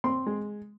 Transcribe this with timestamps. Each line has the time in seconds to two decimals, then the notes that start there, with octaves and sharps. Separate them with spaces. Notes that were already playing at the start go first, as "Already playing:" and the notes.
0.04 C4 C6
0.27 G#3